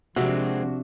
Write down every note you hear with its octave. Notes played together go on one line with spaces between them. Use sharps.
C3 F3 G#3 C4 D4 F#4